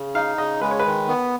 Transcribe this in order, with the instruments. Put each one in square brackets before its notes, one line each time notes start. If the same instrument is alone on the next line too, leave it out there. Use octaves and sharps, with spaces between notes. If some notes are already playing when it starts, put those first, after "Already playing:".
Already playing: [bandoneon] C#3
[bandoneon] D#4 [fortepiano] F5
[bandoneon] C#3 [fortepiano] D#5
[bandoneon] G#3 [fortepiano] B4
[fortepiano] C#5
B4
[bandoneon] D#3
B3